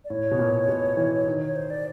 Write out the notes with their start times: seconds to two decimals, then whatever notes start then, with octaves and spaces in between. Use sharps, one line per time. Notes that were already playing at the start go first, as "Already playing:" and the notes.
0.05 D5
0.10 A2 C#5
0.31 B2
0.39 A#2
0.68 B2
0.97 E3
1.27 D#3
1.41 C#5
1.56 C5
1.70 D5